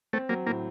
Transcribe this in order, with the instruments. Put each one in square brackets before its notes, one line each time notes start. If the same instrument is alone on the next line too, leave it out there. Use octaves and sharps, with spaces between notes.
[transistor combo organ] A3 [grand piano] C4
[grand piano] F#3 [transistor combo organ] A#3
[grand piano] A2 [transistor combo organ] A#3